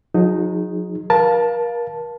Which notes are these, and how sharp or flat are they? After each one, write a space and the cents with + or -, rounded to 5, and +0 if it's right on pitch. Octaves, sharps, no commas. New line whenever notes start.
F#3 -45 D#4 +0 G#4 +0
A#4 +35 F5 +0 A5 +0